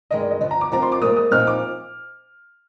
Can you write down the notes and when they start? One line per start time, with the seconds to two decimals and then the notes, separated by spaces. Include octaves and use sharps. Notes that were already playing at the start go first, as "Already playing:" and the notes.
0.11 G2 D#3 G#3 D#5
0.20 D5
0.31 D#5
0.41 G2 D3 F3 D#5
0.51 A#5
0.61 D6
0.72 F2 D#3 G3 C4 F4 A#5
0.82 C6
0.92 D6
1.02 G#2 G3 A#3 D#6
1.17 D#6
1.31 A#2 F3 C4 D#4 F6
1.47 D6